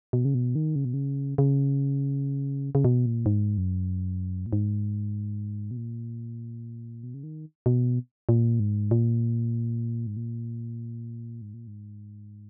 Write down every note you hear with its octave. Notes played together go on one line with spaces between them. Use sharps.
B2
C#3
B2
D#3
C#3
B2
C#3
C#3
C#3
B2
A#2
G#2
F#2
A#2
G#2
B2
A#2
B2
C#3
D#3
B2
A#2
G#2
A#2
G#2
A#2
G#2
A#2
G#2